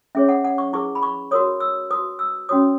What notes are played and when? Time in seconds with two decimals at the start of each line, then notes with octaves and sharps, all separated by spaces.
0.15 C#4 G#4 C#5 E5
0.29 F#5
0.44 F#5
0.58 C#6
0.73 E4 G#4 B4 C#6
0.95 B5
1.03 C#6
1.31 F#4 A#4 C#5 D#6
1.60 E6
1.91 F#4 B4 D#6
2.19 E6
2.49 C#4 F#4 C#5 D#6